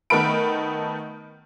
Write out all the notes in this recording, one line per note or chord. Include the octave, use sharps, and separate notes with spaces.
D#3 A3 B3 A#4 B5 D7